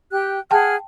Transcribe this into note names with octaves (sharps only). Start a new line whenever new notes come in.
G4 G5 F#6
G#4 F#5 G5 A5 F6